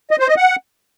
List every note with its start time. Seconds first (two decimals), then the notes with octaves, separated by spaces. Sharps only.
0.11 D#5
0.19 C5
0.28 D#5
0.37 F#5